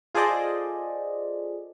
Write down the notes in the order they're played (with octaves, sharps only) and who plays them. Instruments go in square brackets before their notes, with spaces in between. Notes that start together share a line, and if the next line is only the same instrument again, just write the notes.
[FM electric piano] F4 G#4 A4 C5 D5 D#5